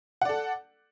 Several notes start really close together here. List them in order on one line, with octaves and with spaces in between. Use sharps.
F#5 D5 A4